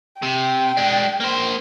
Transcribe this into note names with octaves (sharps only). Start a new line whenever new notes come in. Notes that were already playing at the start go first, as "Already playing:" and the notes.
C3 G5
G#3 D4
A#3 C5